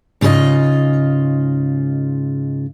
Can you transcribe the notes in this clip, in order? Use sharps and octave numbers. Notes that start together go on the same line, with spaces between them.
G#2 C#3 F4 A4 D#5